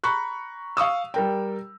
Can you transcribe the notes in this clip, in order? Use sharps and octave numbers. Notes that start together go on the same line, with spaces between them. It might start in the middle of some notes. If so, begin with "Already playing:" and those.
A#5 B5 C#6 F#6
F5 C#6 D#6 E6
G3 A#4 G5